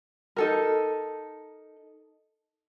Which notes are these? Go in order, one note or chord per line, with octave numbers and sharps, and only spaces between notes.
D#4 A4 A#4